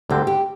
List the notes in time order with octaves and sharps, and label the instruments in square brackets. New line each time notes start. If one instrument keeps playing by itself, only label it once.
[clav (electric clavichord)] D2 D3 G3 C4 [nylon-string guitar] G4
[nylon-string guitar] G4